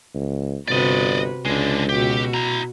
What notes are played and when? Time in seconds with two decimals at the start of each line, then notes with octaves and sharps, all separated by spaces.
0.14 C#2
0.68 G1 C3 F#4 B4 D5 D#5
1.45 C#2 D3 G#3 D4
1.89 B2 F#4 G4
2.34 E4 A#5